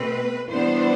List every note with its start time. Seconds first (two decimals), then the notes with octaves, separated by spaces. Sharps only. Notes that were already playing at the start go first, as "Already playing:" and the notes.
Already playing: B2 A3 C4 B4
0.50 E3 G3 B3 D4 C5